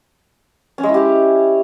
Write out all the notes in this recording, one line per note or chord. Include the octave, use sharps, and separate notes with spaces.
C#4
G#3
E4
G4